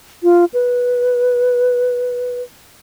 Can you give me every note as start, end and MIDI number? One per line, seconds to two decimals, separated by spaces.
0.23 0.45 65
0.54 2.42 71